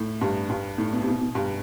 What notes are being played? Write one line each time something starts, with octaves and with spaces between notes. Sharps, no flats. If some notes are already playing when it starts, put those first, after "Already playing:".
Already playing: A2
G2
G2
A2
B2
C3
B2
B2
G2